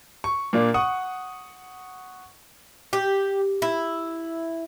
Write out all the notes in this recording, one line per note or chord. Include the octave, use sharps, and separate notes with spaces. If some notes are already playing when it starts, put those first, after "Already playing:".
C#6
A#2 A#3 D4
F#5 C#6 D#6
G4
E4